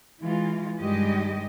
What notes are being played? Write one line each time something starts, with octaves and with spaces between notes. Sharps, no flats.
E3 G#3 F4
G2 D#3 G3 G#3 G4 D#5